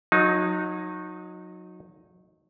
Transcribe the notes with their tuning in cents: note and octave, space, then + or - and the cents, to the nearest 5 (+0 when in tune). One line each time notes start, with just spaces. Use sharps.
F#3 -30 D#4 +0